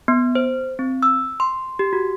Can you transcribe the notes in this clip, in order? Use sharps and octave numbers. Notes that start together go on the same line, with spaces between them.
B3
C5
C4
E6
C6
G4
F#4